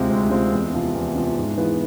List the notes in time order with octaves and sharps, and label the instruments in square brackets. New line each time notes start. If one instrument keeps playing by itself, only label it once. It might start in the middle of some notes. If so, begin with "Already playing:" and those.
Already playing: [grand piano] D2 C3 G#3 C4 F4
D2
C3 G#3 C4 F4
E2
C3 F3
E2
C3 F3
G#2
E3 B3 F4 G#4